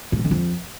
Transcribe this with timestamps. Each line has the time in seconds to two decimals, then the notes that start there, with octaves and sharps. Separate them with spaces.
0.12 G#2
0.18 C3
0.25 D3
0.31 F2